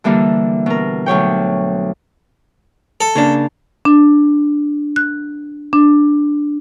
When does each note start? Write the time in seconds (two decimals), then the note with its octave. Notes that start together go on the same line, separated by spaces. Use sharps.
0.04 D3 E3 G3 A#3 D4
0.66 B2 A#4
1.06 D2 F#3 C#5 G5
3.01 A4
3.15 C#3 A#3 D4
3.85 D4
4.96 F#6
5.73 D4